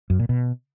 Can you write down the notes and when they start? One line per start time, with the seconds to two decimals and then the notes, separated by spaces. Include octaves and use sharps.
0.10 F#2
0.19 A#2
0.29 B2